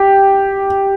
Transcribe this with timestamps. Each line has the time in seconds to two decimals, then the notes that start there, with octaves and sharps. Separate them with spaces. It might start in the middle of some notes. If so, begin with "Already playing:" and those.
Already playing: G4